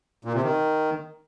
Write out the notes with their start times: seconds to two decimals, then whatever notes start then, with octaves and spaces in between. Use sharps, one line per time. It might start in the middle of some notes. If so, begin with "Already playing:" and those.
0.25 A#2
0.34 C3
0.43 D#3